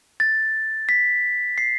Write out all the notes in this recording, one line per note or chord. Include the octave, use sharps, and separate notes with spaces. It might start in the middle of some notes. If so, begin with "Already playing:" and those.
A6
B6
C7